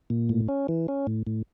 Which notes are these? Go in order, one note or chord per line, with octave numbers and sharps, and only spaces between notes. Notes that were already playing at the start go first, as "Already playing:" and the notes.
A#2
A2
C#4
E3
C#4
A2
A2